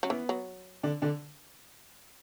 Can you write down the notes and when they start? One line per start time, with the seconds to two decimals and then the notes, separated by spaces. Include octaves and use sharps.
0.03 F#3 C#4
0.10 E3 B3
0.29 F#3
0.83 D3 D4
1.02 D3 D4